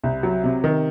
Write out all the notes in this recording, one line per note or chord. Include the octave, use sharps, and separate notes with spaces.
C2
F#3
C3
D#3